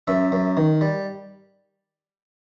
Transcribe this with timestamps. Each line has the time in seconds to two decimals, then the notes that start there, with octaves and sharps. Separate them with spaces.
0.07 F#2 E5
0.32 F#2
0.57 D#3
0.81 G3